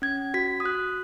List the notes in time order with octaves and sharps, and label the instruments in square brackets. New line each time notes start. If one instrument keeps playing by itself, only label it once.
[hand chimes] C#4 G#6
F#4 B6
D#6
F#4 F#6